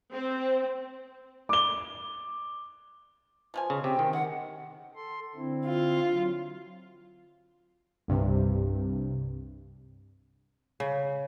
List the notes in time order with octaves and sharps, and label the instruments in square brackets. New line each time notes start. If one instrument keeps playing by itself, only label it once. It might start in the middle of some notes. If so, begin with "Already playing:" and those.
[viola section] C4
[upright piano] D6 G7
[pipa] B2 F3 G#5
[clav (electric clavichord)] C#3
[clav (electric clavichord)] C3 [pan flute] G5
[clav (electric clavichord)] D#3
[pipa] G#3 [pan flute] F#5
[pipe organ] A4 C6
D3 C4 E4
[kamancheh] F4
[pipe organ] F#3
[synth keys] C2 G2 C3
[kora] C#3